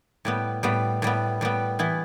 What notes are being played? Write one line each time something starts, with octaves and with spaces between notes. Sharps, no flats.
A2 G3 B3
A2 G3 B3
A2 G3 B3
A2 G3 B3
E3 B3 E4